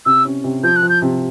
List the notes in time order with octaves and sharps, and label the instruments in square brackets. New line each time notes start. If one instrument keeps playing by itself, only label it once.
[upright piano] C3 [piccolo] E6
[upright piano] C#4
C3
[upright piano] F3 [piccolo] G6
[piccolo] F#6
[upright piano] F3
[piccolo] G6
[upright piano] C3